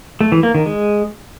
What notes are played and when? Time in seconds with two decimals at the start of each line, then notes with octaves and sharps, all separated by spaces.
0.21 A3
0.32 E3
0.43 A#3
0.55 D#3
0.66 G#3